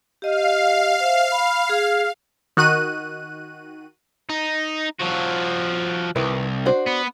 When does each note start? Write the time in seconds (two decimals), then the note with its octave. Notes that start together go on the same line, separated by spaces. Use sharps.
0.22 G4 D#5 F5
1.00 C5 E5
1.32 B5
1.69 G#4
2.57 D#3 F#4 F#6 D#7
4.30 D#4
4.99 F3 F#4
6.16 C2 D#3 E4 B4
6.66 D4 F#4 C5
6.86 B3